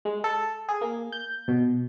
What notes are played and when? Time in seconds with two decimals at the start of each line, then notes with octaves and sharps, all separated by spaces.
0.05 G#3
0.24 A4
0.69 G#4
0.81 A#3
1.12 G6
1.48 B2